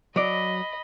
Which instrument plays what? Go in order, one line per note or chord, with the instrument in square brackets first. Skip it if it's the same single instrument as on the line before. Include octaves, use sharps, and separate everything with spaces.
[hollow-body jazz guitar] F#3 D5 [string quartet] D#5 B5